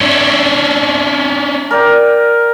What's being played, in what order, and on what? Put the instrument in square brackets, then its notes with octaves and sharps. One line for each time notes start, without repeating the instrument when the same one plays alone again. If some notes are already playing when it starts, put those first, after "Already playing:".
[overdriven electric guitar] C#4 D4 [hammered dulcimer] E5
[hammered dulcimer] A#4 D5 G5